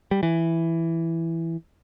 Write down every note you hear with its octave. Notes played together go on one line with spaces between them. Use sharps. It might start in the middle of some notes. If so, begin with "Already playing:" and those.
G3
E3